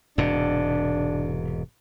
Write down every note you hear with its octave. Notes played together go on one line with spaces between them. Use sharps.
E1 G#2 C3 D4